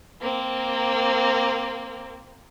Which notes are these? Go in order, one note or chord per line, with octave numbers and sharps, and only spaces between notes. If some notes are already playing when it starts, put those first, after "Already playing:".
A#3 C4